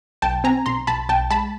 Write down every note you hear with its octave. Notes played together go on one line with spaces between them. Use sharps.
B1 G5 A5
C4 G#5 A#5
B1 A#5 C6
B1 A5 B5
B1 G5 A5
G#3 A5 B5